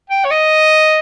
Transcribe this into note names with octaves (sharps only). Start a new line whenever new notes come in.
G5
C#5
D#5